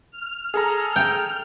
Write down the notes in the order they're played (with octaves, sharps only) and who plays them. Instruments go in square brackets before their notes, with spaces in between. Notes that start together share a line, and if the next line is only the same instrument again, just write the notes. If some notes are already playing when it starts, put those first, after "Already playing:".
[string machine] F6
[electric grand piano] G#4 A4 A#5
[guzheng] G5